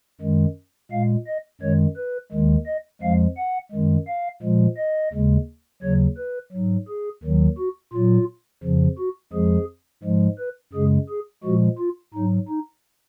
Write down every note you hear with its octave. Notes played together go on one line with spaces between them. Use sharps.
F#2 D#3 G#3
A#2 G#3 F5
D#5
F#2 D#3 G#3 C#5
B4
D#2 D#3 G#3
D#5
F2 F3 G#3 F5
F#5
F#2 D#3 G#3
F5
A#2 F3 G#3
D#5
D#2 C#3 G#3
D#2 C#3 F#3 C#5
B4
G#2 F#3
G#4
D#2 D#3 F#3
F#4
A#2 F#3 F4
F2 C#3 F3
F#4
F2 F3 G#3 G#4
G#2 F3 G#3
B4
F#2 C#3 G#3 G#4
G#4
A#2 F3 G#3 F#4
F4
G#2 F#3 D#4
D#4